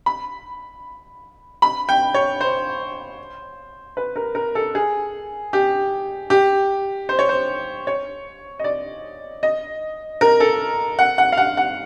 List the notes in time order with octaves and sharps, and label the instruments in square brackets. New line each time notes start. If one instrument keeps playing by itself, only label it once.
[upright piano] B5
B5
G5
C#5
C5
B4
A#4
A#4
A4
G#4
G4
G4
C5
C#5
C5
C#5
D#5
D5
D#5
A#4
A4
F#5
F#5
F5
F#5
F#5